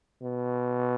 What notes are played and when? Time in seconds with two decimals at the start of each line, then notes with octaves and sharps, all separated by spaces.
0.22 B2